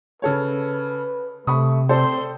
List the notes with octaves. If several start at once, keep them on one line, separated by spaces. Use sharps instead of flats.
C#3 A4 B4 C#5
C3 A3 B5 C#6 D#6
C4 A4 C5 D5 C6